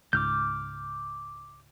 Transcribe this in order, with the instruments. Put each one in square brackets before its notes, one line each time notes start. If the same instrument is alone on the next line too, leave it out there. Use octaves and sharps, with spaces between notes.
[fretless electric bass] C#2 G#2 [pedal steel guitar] D6 F6 G6